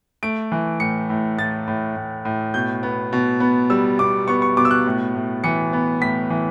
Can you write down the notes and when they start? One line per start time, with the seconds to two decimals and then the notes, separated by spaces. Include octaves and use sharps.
0.23 A3 D7
0.52 E3
0.80 A2 C#7
1.10 A2
1.38 A2 A6
1.68 A2
1.96 A2
2.25 A2
2.54 B2 G6
2.83 B3
3.13 B2
3.40 B3
3.70 G3 E6
3.99 B2 D6
4.28 B3 C#6
4.42 C#6
4.57 B2 D6
4.65 E6
4.71 F#6
4.86 A2
5.15 A2
5.44 E3 C#7
5.73 B3
6.01 A2 B6
6.30 E3